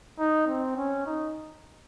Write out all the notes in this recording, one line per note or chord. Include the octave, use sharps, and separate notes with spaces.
D#4
C4
C#4
D#4